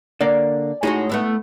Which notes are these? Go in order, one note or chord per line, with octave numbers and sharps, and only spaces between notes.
D3 A#3 D5
A2 G#3 C#4 D#4 F#4
A3 B3 E4